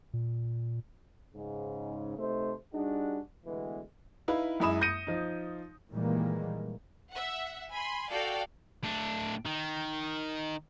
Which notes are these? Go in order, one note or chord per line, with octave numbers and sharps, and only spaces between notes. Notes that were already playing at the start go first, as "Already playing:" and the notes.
A#2
G#2 C#3
C3 A3 D#4 C5
G3 D4 D#4 F#4 G#4
D2 B2 E3 G#3 B3
D#4 E4 B4 F5
F#2 G#3 E4 B5 D#6 E7
G6 A#6 C#7 D#7
F3 D#4
A#2 D#3 E3 G3 G#3 A#3
E5 F#5
G#5 B5 C6
F#4 A4 D5 F5 G5
A2 D4
D#3